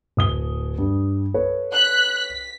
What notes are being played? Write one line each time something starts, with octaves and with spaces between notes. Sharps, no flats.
D1 D#6 G7
G2
A4 B4 C#5
F#6 B6
B6